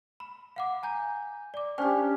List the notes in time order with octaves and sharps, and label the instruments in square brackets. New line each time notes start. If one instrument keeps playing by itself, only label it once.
[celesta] B5
F5 F#5 D6
G#5 A#5 G6
D5 D6
[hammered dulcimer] C#4 D4 G4 [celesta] C5 D5 G5